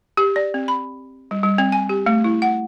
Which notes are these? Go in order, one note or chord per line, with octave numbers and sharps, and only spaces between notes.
G4
D5
C4
B5
G3
G3
C4
G#5
G4
A3
E4
F#5